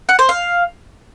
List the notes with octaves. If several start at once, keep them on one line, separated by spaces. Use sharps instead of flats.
F#5
C5
F5